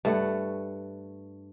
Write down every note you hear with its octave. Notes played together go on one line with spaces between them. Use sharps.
G2 A3 F#5